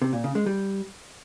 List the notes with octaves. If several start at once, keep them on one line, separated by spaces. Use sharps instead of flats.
C3
A#2
C#3
G#3
G3